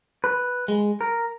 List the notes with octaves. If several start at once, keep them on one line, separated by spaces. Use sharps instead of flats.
B4
G#3
A#4